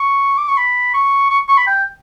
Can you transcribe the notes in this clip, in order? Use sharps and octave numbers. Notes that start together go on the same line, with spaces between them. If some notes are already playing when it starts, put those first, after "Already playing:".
Already playing: C#6
D6
C#6
B5
C#6
C#6
C#6
B5
G5